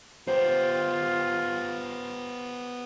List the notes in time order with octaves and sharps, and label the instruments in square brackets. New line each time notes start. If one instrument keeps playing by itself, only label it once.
[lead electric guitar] B3 G4 [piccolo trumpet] F4 [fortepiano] C5